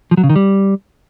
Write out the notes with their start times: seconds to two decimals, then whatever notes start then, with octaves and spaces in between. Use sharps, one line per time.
0.11 F3
0.17 F#3
0.23 C#3
0.30 D#3
0.36 G3